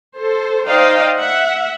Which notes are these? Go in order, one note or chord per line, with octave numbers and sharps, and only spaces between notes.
A4 C5
D#4 C5 D5 D#5 F5 G5
E5 F#5